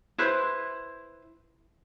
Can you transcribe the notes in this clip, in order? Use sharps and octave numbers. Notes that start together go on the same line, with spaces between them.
E4 B4 C5